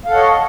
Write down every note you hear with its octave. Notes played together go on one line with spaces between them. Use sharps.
A4 C#5 D#5 F5 F#5